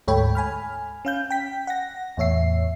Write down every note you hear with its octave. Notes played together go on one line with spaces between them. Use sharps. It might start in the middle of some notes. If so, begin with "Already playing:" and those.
D2 G#2 A4 C#5 G5 B5
G#5 B5 F6
C#4 F5 G6
G5 B6
F#5 A#6
E2 A2 C#5 E5 C7